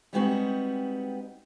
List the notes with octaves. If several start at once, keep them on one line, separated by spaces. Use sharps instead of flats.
G3 G#3 B3 C4 D#4 F#4